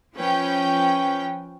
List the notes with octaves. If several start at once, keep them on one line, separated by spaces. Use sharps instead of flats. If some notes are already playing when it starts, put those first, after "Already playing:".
F3 C#4 B4 G5